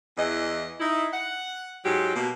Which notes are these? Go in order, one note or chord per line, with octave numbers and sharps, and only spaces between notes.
E2 E3 D#5
D#4 E4
F#5
G#2 F#3 F4 G4
B2 A#3